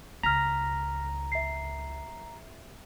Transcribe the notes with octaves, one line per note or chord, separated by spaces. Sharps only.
C#2 A#5 F6 A#6 B6
E5 C7